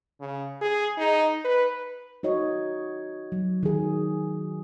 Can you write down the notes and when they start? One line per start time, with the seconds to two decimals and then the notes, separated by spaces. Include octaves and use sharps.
0.21 C#3
0.61 G#4
0.98 D#4
1.45 B4
2.23 D#4 F#4 C#5 D#5
3.32 F#3
3.63 D#3 G#4